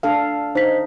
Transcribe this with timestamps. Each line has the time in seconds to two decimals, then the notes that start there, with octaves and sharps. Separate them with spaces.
0.03 D4 A4 F5
0.55 D#4 C5 B6